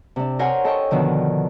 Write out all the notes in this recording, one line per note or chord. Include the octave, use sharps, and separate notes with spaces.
C3 D4
A#4 C5 C#5 F5 F#5 G#5
A4 D#5 G5 C#6
B2 D3 D#3 F3